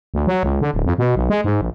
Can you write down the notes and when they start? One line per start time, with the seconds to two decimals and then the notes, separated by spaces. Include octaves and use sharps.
0.14 D2
0.27 F#3
0.43 C#2
0.61 D3
0.74 D1
0.85 F2
0.98 B2
1.16 B1
1.30 G#3
1.44 G#2
1.61 A#1